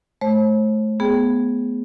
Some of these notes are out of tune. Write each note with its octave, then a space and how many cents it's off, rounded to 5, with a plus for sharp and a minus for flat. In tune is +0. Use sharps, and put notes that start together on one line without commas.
A3 -30 C5 +45
B3 +0 G#4 +0 G5 +0